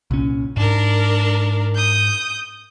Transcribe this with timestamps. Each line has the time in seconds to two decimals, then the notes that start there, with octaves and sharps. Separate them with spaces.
0.11 C2 A#2 C#4
0.57 G#2 D4 A#4
1.75 D#6 G6